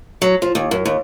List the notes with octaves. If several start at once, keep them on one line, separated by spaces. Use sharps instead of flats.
F#3
F3
D#2
F#2
D#2